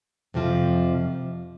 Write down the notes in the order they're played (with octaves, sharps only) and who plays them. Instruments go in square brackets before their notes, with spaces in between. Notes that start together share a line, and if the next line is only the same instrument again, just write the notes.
[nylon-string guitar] F2 C3 F3